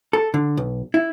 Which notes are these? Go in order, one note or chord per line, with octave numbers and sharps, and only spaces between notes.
A4
D3
B1
E4